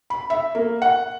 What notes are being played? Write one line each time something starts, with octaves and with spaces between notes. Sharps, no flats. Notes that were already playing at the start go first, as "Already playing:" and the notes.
B5
E5
A#3
F#5